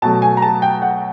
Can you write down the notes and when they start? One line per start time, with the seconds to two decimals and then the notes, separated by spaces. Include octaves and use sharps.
0.02 B2 F#3 A3 A5
0.22 G#5
0.37 A#5
0.42 A5
0.62 G5
0.82 F#5